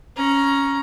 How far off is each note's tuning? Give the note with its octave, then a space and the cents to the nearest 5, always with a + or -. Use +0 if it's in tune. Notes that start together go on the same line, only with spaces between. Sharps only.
C#4 +0 A#5 +15